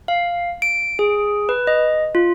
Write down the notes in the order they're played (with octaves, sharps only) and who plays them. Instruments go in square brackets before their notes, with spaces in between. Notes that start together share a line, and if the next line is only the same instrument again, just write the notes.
[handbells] F5
D7
G#4
B4
D#5
F4